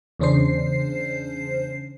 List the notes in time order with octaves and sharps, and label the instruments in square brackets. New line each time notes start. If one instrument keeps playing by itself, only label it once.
[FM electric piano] E2 C#3 C#4 D4 C5 C7